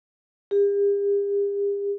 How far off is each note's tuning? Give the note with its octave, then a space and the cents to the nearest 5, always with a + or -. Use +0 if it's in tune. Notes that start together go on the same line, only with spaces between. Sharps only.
G4 +45